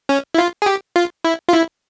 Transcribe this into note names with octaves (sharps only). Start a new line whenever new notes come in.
C#4
E4
F4
G#4
G4
F4
E4
F4
E4